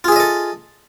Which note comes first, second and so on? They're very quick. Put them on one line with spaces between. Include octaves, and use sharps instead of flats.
F4 G#4 E5 D#5 A4